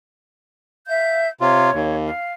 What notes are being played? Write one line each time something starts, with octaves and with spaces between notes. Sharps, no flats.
E5 F5 G6
C3 F4 C#5
D#2
F5